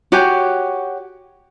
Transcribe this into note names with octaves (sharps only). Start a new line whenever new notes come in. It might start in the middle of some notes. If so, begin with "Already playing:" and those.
F#4 G4 C#5 G#5